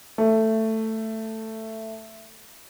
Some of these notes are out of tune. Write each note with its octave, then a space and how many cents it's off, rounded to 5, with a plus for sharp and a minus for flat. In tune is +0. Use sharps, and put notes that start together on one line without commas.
A3 +10